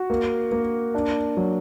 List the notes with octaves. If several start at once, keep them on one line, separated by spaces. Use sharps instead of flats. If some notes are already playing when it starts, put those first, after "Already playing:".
Already playing: F#4
A#3
A#3
D4
F#3